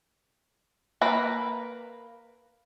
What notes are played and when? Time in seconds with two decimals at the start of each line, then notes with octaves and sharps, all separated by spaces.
1.01 A#3 B4 A#5